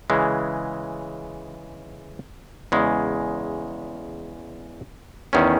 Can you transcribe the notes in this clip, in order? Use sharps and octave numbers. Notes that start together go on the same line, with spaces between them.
C#3 E3 G#3
E2 C#3 G#3
E2 D#3 A3 C#4